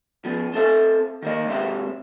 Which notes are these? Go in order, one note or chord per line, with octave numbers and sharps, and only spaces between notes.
F3 B3
C4 A4 E5
D#3 A#3 D#5
G#2 C3 D#3 C4 E5